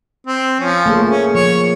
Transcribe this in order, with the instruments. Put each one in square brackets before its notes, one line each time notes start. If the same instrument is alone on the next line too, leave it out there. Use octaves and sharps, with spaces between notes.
[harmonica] C4
F3 C#4
[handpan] A3 A#3 G#4
[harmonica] C#4
[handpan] F3 [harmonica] C#5